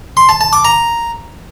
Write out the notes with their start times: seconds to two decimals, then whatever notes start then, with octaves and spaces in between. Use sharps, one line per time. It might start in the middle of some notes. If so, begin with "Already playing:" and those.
0.17 C6
0.29 A5
0.41 A5
0.53 D6
0.65 A#5